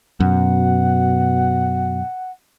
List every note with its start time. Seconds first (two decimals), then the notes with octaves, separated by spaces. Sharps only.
0.20 F#2 B2 F#5